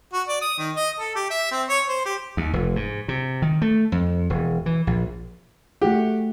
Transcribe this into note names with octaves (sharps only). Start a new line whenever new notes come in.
F#4
D5
D#6
D#3
D#5
A4
G4
E5
C4
C#5
C5
G4
D#2
F1
G#2
C3
D#3
A3
F2
E1
E3
A#1
A3 F#4 G4 F#5